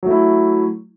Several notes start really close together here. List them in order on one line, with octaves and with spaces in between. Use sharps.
F#3 A3 E4